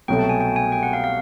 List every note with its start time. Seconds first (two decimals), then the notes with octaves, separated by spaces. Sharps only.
0.08 C2 B2 F#3 A3 G5
0.19 A5
0.29 G#5
0.41 G5
0.56 G#5
0.72 G5
0.83 F#5
0.93 F5
1.04 F5